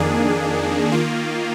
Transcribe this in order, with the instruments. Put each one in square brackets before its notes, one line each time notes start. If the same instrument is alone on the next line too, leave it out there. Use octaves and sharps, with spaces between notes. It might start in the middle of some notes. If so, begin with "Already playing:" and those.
Already playing: [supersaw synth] F2 D#3 A#3 D4 G#4
D#3 A#3 F4